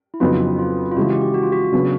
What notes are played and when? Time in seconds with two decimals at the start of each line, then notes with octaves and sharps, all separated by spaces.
0.14 E4
0.20 F2 C#3 F#3 B3 D#4 F4
0.59 F4
0.91 F4
0.97 C#3 E3 G#3 F#4
1.10 G4
1.21 G4
1.34 F#4
1.43 F4
1.52 F#4
1.72 C#3 F#3 B3 D4